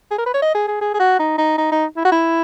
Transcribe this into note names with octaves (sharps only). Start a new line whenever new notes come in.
G#4
A#4
B4
C#5
D#5
G#4
G#4
G#4
G#4
F#4
D#4
D#4
D#4
D#4
E4
F#4
E4